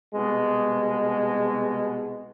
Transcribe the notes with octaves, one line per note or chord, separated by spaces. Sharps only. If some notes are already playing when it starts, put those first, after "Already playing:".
C2 B2 G#3